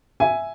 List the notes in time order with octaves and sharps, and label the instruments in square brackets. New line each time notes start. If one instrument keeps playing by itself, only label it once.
[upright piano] E5 G#5